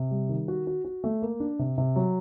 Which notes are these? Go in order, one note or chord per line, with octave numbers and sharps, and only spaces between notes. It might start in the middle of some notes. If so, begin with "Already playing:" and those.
Already playing: C3
G3
D#3
F#4
F#4
F#4
A3
A#3
D4
C3
C3
F#3